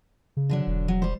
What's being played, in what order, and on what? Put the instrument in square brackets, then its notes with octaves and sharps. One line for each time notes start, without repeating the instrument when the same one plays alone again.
[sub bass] C#3
[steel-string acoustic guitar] D3 F#3 D4
[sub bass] E1
[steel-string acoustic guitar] F#3
G3 C5